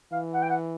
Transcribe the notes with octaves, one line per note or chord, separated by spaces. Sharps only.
E3 F5
F#5
G5
F#5